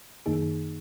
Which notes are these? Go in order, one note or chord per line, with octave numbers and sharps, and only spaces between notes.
F#2 D#3 A#3 D#4 G#4